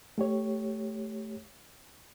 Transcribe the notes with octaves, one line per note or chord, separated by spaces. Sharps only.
A3 G4 C#5